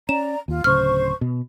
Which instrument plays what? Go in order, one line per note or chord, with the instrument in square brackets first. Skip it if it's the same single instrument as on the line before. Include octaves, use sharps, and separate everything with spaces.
[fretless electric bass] C#4 [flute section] D5 A#5 [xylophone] E7
[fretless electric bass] D#2 [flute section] F4
[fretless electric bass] D1 C#3 [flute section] C5 C#6 [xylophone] F6
[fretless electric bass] B2